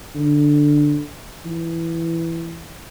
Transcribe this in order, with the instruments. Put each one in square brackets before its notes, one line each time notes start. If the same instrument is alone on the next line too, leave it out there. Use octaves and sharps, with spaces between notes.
[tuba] D3
E3